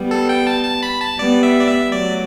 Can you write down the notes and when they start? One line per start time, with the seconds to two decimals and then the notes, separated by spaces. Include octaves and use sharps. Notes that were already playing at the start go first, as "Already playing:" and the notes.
Already playing: G3 B3
0.11 A4
0.29 G5
0.47 A5
0.64 A5
0.83 B5
1.01 A5
1.19 G3 B3 D5
1.43 E5
1.60 D5
1.67 E5
1.92 F#3 A3 D5